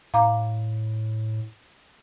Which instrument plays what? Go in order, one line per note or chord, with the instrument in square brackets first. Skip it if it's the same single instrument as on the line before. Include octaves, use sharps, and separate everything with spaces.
[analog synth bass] A2 [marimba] F5 A#5 D6